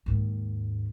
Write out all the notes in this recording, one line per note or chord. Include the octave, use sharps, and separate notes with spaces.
D#2 G#2